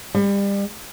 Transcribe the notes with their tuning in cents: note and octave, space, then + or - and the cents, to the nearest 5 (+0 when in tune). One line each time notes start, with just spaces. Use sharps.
G3 +30